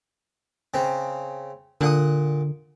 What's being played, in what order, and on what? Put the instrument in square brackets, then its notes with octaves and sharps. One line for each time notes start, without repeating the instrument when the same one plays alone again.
[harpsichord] C#3 C4
[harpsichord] A#2 F#5 D#6 [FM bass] D3